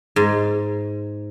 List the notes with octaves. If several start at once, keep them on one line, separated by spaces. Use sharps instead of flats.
G#2